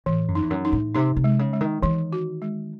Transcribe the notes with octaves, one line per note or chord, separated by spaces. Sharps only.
A2 E3
F#2
D#4
E2
F#2
D#4
A2
C3 D#4
C3
G#3
C#3
G#3
D#3
D#3 E3
F#4
G#3